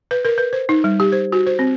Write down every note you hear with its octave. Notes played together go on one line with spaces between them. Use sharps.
B4
A#4
B4
C5
D#4
G3
G4
C5
F#4
C5
C4